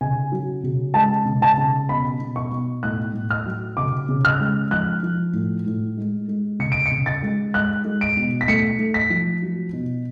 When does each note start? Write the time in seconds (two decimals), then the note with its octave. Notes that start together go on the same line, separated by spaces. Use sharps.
0.01 C#3 G#5
0.32 F#3
0.64 C#3
0.94 G#3 A5
1.26 C#3
1.42 A5
1.57 C#3
1.89 B2 B5
2.21 B2
2.36 C#6
2.51 B2
2.83 A2 F#6
3.14 A2
3.30 F6
3.46 F#3
3.77 C#3 D6
4.09 C#3
4.25 F6
4.40 G#3
4.71 F3 F#6
5.03 F3
5.33 A2
5.66 A2
5.97 G#3
6.28 G#3
6.59 C#3 C#7
6.72 D7
6.86 C#7
6.91 C#3
7.06 A6
7.23 G#3
7.54 G#3 F#6
7.85 G#3
8.01 D7
8.17 B2
8.41 B6
8.48 A3 C#7
8.79 A3
8.94 B6
9.10 F3
9.42 F#3
9.73 B2